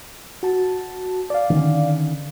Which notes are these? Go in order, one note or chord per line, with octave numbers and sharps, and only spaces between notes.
F#4 A5
D5 F5
D3 D#3 C#4